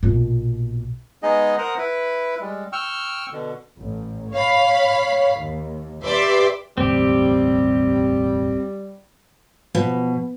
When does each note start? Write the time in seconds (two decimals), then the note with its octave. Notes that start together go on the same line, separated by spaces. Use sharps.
0.03 A#1 B2
1.23 G#3 B3 D#4 G#4 D#5
1.58 A#4 C5 F#5 A#5 D#6
1.78 E4 B4
2.40 G3 G#3
2.73 G5 C#6 E6 F6
3.32 B2 D3
3.78 A1
4.33 C#5 F5 B5
5.39 D#2
6.04 G4 B4 D5 E5 C6 D6
6.78 E1 A1 D2 G3 C4 G4
9.75 B2 F3